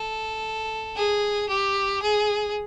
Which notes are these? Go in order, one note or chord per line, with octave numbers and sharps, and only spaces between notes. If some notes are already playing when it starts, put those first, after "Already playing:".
Already playing: A4
G#4
G4
G#4